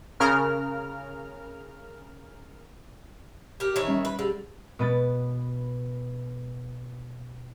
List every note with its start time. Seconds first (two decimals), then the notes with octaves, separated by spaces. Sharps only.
0.20 C#3 A#4 F6
3.60 G4 A#4
3.76 D#3 E3 C#5
3.88 G3 C#4
4.05 B4
4.19 D3 G4 G#4
4.79 B2 B3 A6